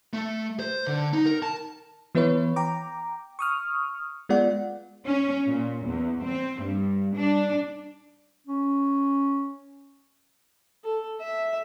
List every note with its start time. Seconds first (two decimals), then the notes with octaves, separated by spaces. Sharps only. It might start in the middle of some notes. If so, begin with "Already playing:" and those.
0.13 A3
0.59 C5
0.87 D3
1.13 D#4
1.26 A#4
1.42 A5
2.15 E3 B3 E4 B4 C#5
2.56 G5 A#5 D6
3.39 C#6 D#6 F6
4.29 G#3 B3 F4 D5 F#5
5.06 C#4
5.47 A#2
5.87 E2
6.23 C4
6.63 G2
7.16 D4
8.47 C#4
10.84 A4
11.21 E5